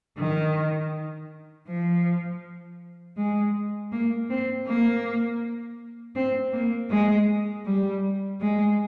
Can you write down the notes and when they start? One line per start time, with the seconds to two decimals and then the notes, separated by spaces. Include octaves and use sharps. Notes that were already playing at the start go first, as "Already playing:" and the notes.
0.19 D#3
1.68 F3
3.17 G#3
3.91 A#3
4.29 C4
4.66 A#3
6.15 C4
6.53 A#3
6.90 G#3
7.65 G3
8.40 G#3